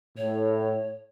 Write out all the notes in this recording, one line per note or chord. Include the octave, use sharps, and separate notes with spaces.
A2 C#5